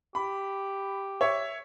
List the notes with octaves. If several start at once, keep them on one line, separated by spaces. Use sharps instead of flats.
G4 B5
C#5 E5